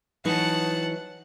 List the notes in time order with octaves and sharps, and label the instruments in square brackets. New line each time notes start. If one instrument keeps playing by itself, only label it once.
[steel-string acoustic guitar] E3 F#3 D#4 [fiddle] F#5 A5